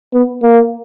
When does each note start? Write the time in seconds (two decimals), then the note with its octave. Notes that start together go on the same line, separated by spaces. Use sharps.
0.14 B3
0.42 A#3